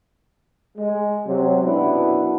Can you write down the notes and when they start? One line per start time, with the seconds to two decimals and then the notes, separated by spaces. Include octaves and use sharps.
0.77 G#3
1.26 C3 F#3
1.63 F#2 B2 B3 D4 E4